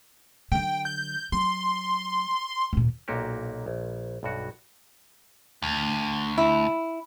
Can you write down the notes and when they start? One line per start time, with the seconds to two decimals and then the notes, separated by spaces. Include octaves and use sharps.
0.52 D3 F#3 G5
0.85 G6
1.32 F#3 C6
2.73 D#2 A#2
3.08 B1 A#2 A#3 F#4 G4
3.66 A#1
4.23 B1 G2 F#4
5.62 D2
6.38 E4